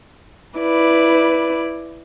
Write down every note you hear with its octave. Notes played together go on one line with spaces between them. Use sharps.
E4 B4 D5